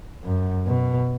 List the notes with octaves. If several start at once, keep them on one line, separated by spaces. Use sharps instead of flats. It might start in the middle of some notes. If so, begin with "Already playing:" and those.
F#2
B2